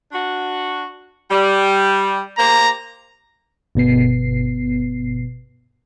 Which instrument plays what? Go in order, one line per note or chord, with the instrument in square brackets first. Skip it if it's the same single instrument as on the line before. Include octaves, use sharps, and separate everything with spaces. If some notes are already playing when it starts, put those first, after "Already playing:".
[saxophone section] D4 F#4
G3
[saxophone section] A#3 G4 C5 [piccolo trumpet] A#5
[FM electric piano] G1 B2 B3 C7